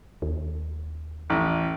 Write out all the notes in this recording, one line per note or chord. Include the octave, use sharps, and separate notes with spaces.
D#2
A1